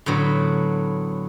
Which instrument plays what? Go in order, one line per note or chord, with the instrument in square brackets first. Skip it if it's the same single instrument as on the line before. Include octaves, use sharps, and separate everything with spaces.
[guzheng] A2 D3 F#3 B3